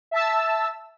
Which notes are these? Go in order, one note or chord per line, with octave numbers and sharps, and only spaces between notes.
E5 A5 E6